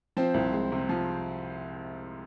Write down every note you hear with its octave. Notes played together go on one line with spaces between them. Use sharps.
F3 C4 C5
C2
G#3
C3
F3